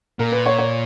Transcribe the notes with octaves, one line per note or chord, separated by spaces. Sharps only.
A#2 A#4
B4
C#5
C#5